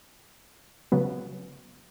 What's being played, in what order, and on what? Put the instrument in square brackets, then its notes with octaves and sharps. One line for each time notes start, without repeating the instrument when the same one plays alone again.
[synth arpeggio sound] C#3 F#3 B3